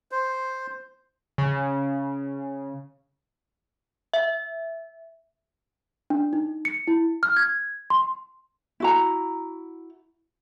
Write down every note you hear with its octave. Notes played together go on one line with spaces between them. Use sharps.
C5
C#3
E5
D4
D#4
C#7
E4
F6
G#6
C6
E4 F#4 A#5